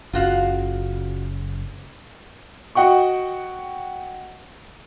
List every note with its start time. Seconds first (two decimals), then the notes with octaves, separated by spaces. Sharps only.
0.13 F#1 C#3 F4 F#4 F5
2.75 F#4 D#5 F#5 G5 C#6